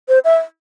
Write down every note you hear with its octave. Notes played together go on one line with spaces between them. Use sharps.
C5
E5